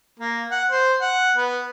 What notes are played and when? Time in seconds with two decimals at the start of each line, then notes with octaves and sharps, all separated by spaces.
0.20 A#3
0.51 F#5
0.71 C5
1.02 F#5
1.37 B3